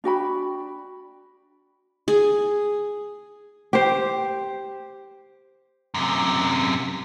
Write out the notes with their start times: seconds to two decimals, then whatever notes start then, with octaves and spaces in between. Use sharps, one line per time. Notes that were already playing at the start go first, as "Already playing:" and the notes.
0.04 D4 F#4 G5 B5
2.08 G#4
3.73 G4 C5
5.94 F#2 C3